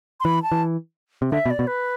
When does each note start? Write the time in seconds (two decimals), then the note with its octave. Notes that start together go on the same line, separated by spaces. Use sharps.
0.20 C6
0.24 E3 B5
0.43 A5
0.52 E3
1.22 C3
1.31 D3 E5
1.46 B2
1.50 D5
1.59 B2
1.67 B4